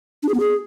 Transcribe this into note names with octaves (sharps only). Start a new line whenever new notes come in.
D4
G#4
B3
G#4